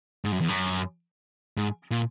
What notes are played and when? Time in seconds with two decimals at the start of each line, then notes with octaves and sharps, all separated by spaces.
0.25 G#2
0.32 F#2
0.41 E2
0.49 F#2
1.57 G#2
1.91 A#2